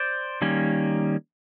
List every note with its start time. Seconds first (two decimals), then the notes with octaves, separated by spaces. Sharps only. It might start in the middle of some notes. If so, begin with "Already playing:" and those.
Already playing: C5 D5
0.42 D#3 G3 A#3 C#4